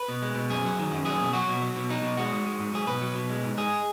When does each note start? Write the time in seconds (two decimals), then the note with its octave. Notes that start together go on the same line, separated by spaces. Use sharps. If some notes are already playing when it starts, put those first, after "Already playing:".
Already playing: B4
0.08 B2
0.22 G#3
0.35 B2
0.50 F#2 G#4
0.64 F#3
0.78 D#3
0.92 F#2
1.05 F#3 G#4
1.20 B2
1.33 F#3 F#4
1.48 B2
1.62 F#3
1.76 B2
1.89 F#3 D#4
2.03 B2
2.17 G#3 F#4
2.32 G#2
2.46 G#3
2.60 G#2
2.74 F#3 G#4
2.87 B2 B4
3.02 F#3
3.15 B2
3.29 G#3
3.44 G#2
3.57 G#3 G#4